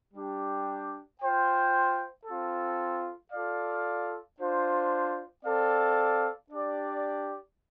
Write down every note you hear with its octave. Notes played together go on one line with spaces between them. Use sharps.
G3 D4 G4
F4 C5 G5
C4 F4 A4
F4 A4 D5 F5
D4 F4 C5
C4 A4 D5 F5
D4 G4 D5